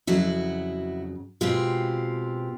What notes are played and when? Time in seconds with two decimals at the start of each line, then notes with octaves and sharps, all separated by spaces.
0.07 F2 C#3 F#3 E4 F#4
1.41 B2 G#3 C4 F4 G4